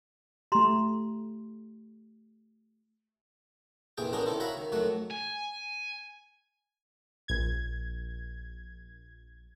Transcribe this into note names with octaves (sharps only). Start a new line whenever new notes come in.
A3 G4 A#5 C6
A#1 F2 E3 G#4 G5
B3 C#4 D4 G#4 A#4
D#3 C4 E4 A4
F#4 C#5 E5 F5 A#5 B5
D#3
F2 D#3 F#3 A3 F#5
G#5
A#1 G#6